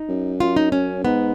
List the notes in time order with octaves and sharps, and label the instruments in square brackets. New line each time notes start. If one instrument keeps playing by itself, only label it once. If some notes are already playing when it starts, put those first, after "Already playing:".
Already playing: [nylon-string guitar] D#4
[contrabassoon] F#2
[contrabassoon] F#2 [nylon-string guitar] F4
[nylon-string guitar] D#4
[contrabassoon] F#2 [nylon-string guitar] C#4
[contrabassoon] G#2 [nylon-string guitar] B3